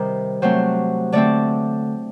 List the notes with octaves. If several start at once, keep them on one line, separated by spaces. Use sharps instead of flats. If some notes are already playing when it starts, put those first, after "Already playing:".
Already playing: C3 D#3 G3 A#4 C5
C3 F#3 A3 C4 C5
D3 A3 C4 D5